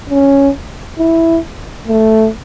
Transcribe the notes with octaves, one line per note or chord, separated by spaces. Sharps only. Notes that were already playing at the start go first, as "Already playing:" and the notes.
C#4
E4
A3